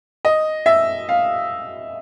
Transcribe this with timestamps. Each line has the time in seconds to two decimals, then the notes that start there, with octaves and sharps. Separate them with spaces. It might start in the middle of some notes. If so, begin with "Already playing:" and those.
0.25 D#5
0.66 E5
1.09 F5